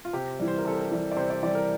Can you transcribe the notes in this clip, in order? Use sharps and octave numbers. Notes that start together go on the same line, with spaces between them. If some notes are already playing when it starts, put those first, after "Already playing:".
F4
C3 G4
E3 G3
C5
A#4
C3 A4
A#4
E3 G3
D5
C3 C5
D5
E3 G3 D5
A#4